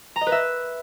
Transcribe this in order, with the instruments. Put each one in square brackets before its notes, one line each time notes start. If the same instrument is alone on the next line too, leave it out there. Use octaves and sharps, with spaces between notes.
[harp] A#5
D#5
B4
E5